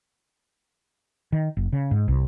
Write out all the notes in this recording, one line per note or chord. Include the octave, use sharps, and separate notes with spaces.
D#3
F#1
C#3
G#2
C2